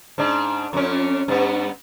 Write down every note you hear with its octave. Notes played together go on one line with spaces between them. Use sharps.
G#2 D4
F2 C#4
G2 B3